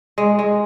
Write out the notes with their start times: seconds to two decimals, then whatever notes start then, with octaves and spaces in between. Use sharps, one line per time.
0.18 G#3
0.39 G#3